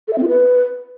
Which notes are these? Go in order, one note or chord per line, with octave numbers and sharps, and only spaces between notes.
A4
E5
C4
F4
B4